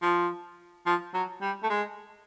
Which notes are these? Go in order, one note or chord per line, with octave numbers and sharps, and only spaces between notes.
F3
F3
F#3
G3
A3
G#3